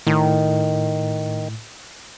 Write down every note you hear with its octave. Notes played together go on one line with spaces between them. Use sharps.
A2 D#3